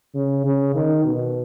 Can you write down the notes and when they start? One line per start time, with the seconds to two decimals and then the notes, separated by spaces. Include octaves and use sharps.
0.14 C#3
0.44 C#3
0.75 D#3
1.05 B2